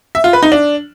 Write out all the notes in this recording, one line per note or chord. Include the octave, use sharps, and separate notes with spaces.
E5
F4
B4
D#4
D4